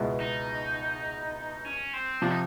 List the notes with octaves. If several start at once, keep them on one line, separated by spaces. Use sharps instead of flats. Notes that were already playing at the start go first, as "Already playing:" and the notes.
Already playing: C#2 B2 G#3 B3 E4
D#4
C#4
C4
C3 F3 D4
D#4